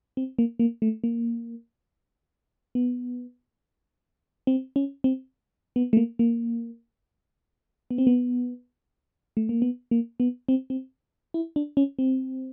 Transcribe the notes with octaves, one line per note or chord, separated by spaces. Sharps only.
C4
A#3
A#3
A3
A#3
B3
C4
C#4
C4
B3
A3
A#3
A#3
B3
C4
B3
A3
A#3
B3
A#3
B3
C4
C4
E4
D4
C#4
C4